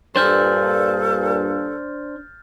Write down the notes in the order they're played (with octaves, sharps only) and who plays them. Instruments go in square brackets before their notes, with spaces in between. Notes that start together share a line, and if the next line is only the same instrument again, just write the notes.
[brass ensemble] G2 A#2 [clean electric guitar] D4 C5 [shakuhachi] A4 [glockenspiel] F6 G6 A6